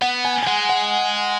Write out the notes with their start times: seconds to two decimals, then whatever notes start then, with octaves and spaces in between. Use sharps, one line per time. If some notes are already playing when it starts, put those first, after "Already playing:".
0.02 B3 F#5
0.25 G#5
0.43 G#5
0.47 G#3 F#5
0.69 F#5